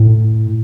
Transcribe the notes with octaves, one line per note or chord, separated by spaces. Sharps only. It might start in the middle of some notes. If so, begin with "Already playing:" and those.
Already playing: A2